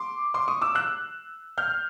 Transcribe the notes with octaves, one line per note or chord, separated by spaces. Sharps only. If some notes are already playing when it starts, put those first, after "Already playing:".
Already playing: C6 D6
C6 D6
C#6 D#6
D6 E6
E6 F#6
F6 G6